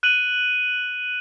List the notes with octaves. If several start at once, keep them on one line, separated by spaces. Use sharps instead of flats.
F#6 D#7 F#7